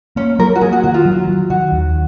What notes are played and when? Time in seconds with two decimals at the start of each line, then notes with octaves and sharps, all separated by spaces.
0.16 A#3 C#4
0.39 F#3 A#4
0.55 F#4
0.61 A#3 G#4
0.72 F#4
0.83 D#3 F#4
0.94 F4
1.05 F#3
1.28 F#3
1.50 D#3 F#4
1.72 D#2